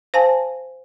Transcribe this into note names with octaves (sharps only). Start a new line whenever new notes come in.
C5 F5 G#5 A5